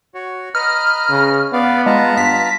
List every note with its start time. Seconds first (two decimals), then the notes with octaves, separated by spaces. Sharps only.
0.14 F#4 C#5
0.55 B4 D#5 A#5 F6
1.10 C#3
1.53 B3 D5 F5
1.86 G#3 F4 A5 A#5
2.17 G2 B6